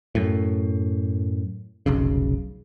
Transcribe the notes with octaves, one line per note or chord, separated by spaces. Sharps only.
F#2 A2
F1 B1 C#3